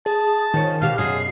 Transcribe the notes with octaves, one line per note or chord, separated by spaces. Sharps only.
G#4 A5
D#3 F3 C#4
B2 G4 F5
F#2 B2 F#3 G#4 C7